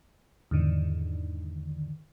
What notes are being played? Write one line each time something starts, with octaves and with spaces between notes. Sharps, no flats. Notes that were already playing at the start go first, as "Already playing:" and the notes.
E2 G#2 D3 D#3